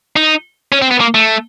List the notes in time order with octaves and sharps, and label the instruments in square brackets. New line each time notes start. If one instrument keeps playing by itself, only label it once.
[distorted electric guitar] D#4
C#4
C4
B3
A#3
A3